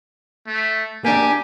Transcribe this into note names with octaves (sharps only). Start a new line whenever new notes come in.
A3
A#3 D4 G4 G#5